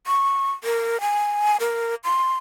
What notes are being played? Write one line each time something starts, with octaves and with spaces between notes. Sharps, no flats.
C#6
A#4
G#5
A#4
C6